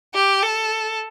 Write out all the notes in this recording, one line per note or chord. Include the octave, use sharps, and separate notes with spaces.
G4
A4